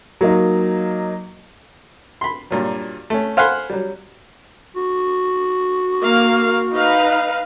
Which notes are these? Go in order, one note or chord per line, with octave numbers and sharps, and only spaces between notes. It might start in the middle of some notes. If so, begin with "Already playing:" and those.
F#3 A#3 D#4
B5 C6
G2 A#2 F#3
A3 C#4
C5 F5 F#5 G#5 B5 C6
F#3 G3
F#4
A#3 F5
D#4 B4 F5